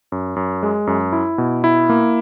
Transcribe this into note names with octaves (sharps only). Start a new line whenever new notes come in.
F#2
F#2
G#3
F#2
E4
B2
E4
A#3